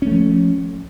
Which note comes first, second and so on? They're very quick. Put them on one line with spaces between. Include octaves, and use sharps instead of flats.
C#4 A3 F3